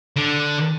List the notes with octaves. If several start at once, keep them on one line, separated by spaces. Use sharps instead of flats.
D3